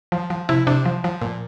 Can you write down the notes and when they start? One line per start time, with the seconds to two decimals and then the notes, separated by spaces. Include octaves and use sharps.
0.12 F3
0.30 F3
0.49 C3 E4
0.67 C3 D4
0.85 F3
1.04 F3
1.22 A#2